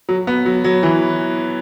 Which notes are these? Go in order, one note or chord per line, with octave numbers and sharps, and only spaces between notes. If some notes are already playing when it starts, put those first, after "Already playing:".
F#3
B3
F#3
F#3
E3